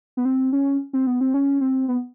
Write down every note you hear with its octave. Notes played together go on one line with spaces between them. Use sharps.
B3
C4
C#4
C4
B3
C4
C#4
C4
B3